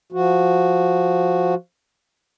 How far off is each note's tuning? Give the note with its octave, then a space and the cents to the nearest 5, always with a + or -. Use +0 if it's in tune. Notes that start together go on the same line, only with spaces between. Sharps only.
F3 +0 F#4 -5